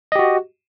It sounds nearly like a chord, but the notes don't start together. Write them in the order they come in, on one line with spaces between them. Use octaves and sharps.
D#5 G4 F#4